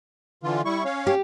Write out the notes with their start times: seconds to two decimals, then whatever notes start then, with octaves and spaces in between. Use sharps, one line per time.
0.43 D3 E3 F4
0.65 G3 E4 C#6
0.85 C#4 C#5 F5
1.07 G4